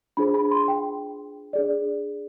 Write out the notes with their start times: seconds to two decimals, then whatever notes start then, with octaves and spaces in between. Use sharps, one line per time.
0.17 D4 F4 G#4 C5 B5
0.34 B5
0.52 C6
0.68 G5
1.53 D4 G#4 D5